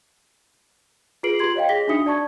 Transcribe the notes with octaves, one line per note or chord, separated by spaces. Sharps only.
F4 G#4 B4 C7 D7 F#7
F4 G4 C6 G#6 F#7
C#5 D#5 F5 G5
G#4 A#6 B6 G7
D4 D#4 F#4 E5 D#6 C#7
D5 A5 C#6 G#6